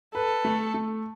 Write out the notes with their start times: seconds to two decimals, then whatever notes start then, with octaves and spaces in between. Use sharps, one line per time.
0.15 A4 B4
0.45 A3
0.74 A3